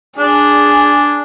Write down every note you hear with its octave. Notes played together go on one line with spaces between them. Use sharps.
D4 G#4